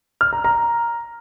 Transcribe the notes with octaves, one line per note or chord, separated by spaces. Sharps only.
F6
A#5
A#5